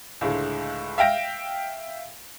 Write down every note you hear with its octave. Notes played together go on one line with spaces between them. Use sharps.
C#2 A2 D3 G#3
E5 F5 G5 A#6 D7